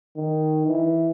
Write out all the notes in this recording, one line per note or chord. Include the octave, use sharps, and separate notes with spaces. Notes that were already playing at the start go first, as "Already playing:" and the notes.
D#3
E3